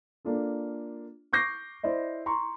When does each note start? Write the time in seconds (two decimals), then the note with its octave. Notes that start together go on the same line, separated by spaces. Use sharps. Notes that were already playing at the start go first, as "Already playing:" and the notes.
0.25 A#3 D4 F4 A4
1.33 C#6 D6 G6 A#6 C7
1.83 E4 C5 D5 D#5
2.26 A#5 C6 C#6